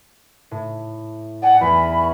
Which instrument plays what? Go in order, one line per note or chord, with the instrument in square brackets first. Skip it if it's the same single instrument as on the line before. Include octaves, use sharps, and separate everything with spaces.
[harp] A2
[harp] D5 G#5 [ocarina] F#5
[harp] E2 [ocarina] B5
[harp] C#6